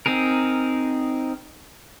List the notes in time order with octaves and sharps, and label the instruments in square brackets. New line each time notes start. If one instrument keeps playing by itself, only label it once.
[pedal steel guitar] C4 D#4 G#4 A#4